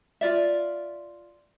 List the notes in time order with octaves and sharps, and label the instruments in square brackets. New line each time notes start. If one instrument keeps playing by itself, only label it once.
[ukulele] F4 D5 E5